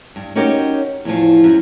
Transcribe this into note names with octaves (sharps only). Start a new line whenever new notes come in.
G2
C#4 D#4 F#4 G4 A#4 C#5
E2 A2 E3 F3
F#2